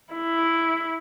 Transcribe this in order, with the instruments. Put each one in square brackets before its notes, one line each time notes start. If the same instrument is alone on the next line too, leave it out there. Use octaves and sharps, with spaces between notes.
[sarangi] E4